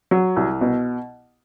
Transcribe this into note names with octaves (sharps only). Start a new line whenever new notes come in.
F#3
C2
B2